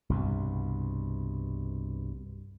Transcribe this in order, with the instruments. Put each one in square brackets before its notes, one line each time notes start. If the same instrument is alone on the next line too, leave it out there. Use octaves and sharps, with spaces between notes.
[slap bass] C2 G2 B2